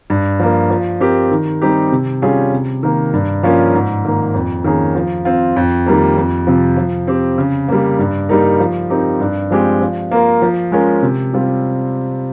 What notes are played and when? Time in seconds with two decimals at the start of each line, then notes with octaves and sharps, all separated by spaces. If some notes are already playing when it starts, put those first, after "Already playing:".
0.10 G2
0.40 F3 A#3
0.70 F3
1.00 C4 G4 A#4
1.31 D#3
1.62 G3 C4 D#4 G4
1.92 C3
2.22 G3 C#4 F4 G#4
2.52 C3
2.83 D#3 A#3
3.13 G2
3.43 F3 A#3 C#4 F4
3.74 G#2
4.05 D#3 A#3
4.34 F2
4.64 D#3 A#3 C#4 G#4
4.95 F3
5.25 C4 F4
5.56 F2
5.86 D#3 G3 A#3
6.17 F2
6.47 C3 F3
6.77 F3
7.08 C4 G4
7.38 C#3
7.69 G3 A#3
7.99 G2
8.29 G3 A#3 D#4 A#4
8.60 F3
8.90 C4 D#4 G4 A#4
9.20 G2
9.51 F3 G#3 C4 G4
9.81 F3
10.11 A#3 F4 A#4
10.42 F3
10.72 G#3 C#4 F4 A#4
11.03 C3
11.34 G3 C4 F4